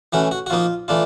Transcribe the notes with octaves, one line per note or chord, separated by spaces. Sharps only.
E3 A3 C#4 F#4
F#4
F#4
F3 A#3 D#4 F4
E3 A3 D4 F4